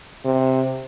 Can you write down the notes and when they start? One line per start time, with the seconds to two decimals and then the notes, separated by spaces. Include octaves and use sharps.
0.25 C3